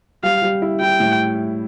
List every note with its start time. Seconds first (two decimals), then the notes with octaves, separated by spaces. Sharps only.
0.23 G3 F5
0.42 G3
0.62 E4
0.81 E4 G5
1.00 A2